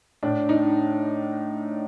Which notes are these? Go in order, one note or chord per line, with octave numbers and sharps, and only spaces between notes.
A2 D4
D#4